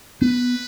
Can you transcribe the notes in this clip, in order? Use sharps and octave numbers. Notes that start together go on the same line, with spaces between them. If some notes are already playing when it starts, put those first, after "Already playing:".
B3 B4